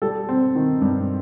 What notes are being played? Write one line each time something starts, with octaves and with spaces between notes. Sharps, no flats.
G3 A4
C4
D#3
G2